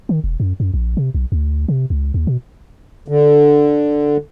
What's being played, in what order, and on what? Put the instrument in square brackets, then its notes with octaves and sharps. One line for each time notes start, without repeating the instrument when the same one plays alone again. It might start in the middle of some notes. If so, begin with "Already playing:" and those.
[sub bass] D#3
E1
F#2
F#2
A#1
C3
B1
D2
C3
C#2
D#2
B2
[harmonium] D3